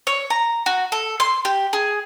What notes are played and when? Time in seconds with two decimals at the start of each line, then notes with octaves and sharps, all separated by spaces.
0.07 C#5
0.30 A#5
0.66 F#4
0.92 A4
1.20 C6
1.45 G4
1.73 G#4